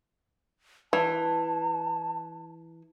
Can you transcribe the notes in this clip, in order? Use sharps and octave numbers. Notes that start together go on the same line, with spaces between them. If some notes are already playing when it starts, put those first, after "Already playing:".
E3 A5